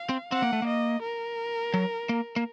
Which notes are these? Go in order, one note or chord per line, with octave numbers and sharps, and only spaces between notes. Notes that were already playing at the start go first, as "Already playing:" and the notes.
Already playing: F5
C4
C4 F#5
A#3
A3
A#3
D#5
A#4
F#3
A#3
A#3